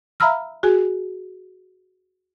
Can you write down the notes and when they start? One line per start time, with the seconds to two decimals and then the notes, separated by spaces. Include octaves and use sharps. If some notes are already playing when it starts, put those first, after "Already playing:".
0.20 E5 F5 A#5 B5 E6 F6
0.63 F#4 G#4 G#5